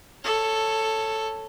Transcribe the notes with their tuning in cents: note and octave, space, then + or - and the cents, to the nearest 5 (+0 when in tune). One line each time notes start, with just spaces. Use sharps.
A4 +5 C#5 +0